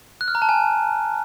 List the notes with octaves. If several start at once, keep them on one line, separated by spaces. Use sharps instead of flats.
F#6
F6
A#5
A5
G#5